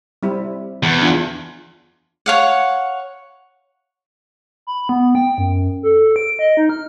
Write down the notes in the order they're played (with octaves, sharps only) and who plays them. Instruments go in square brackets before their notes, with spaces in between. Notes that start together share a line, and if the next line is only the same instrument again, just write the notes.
[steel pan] G3 C4 E4
[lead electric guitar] E2
[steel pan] D4 F4
[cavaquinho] C#5 F5 F#5
[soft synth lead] B5
B3
G5
F#2
A4
D7
D#5
D#4
F6